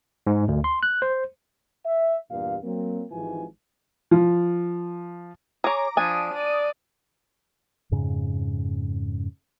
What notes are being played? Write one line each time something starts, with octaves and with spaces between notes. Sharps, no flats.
G#2
D2
C6
F#6
C5
E5
E2 G2 A#2 G4 F5
F#3 A#3 C4
G#1 G#2 E3 F3 G4 G#5
F3
G#4 C#5 A#5 D6
F3 D4 G#5 D#6 D#7
D5
F2 G#2 C#3